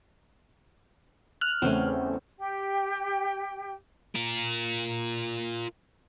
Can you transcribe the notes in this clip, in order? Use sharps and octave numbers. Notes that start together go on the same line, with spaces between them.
F6 F#6
E2 C#3 A3 C4 C#4
G4 G5
F4 A#4